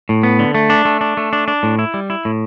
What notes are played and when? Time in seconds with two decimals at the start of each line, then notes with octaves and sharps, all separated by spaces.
0.09 A2
0.23 B3
0.39 D3
0.55 A3
0.70 D4
0.85 A3
1.01 D4
1.17 A3
1.33 D4
1.48 D4
1.63 A2
1.79 E4
1.94 G3
2.10 E4
2.25 A2